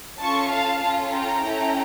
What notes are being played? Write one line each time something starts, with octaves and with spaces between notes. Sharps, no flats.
C#4 F4 A4 A5 C#6
F5 A5
C#4 F4 A4
G5 A#5
C#4 E4 A4